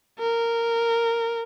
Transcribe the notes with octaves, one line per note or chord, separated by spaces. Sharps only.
A#4